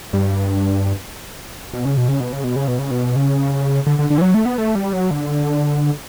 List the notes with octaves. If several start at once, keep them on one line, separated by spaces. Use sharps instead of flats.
G2
B2
C#3
B2
C#3
B2
C#3
B2
C#3
B2
C#3
B2
C#3
D3
D3
D3
E3
F#3
A3
B3
A3
G3
F#3
D3